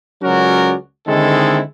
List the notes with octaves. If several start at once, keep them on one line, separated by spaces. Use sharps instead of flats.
C#2 F#3 C#4 F#4 A#4 D5
D3 D#3 G#3 C4 E4 A4